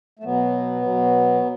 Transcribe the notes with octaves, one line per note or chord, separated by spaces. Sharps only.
A3
B2 F#3 B3
F#3
B2